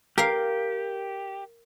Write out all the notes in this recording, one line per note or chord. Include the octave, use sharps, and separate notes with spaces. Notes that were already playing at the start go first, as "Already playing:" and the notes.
G4 A#4 F5